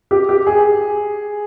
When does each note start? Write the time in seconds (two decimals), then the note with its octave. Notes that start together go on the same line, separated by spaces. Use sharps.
0.11 G4
0.29 G4
0.47 G#4